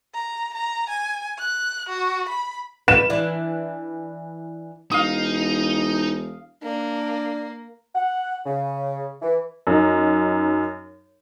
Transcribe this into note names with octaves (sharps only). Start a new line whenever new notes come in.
A#5
A#5
G#5
F#6
F#4
B5
B4 E7
E3 D4 E4
E1 D#4 F5 D#6
A#3 D4
F#5
C#3
E3
F#2 D#4